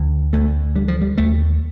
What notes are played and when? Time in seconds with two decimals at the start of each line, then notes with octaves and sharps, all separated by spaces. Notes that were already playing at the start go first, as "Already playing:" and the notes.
Already playing: D2 D3
0.33 D2 A3
0.75 D3 G3
0.88 F3
1.01 G3
1.18 D#2 A3